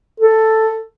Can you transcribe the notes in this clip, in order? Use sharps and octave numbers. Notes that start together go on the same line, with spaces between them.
A4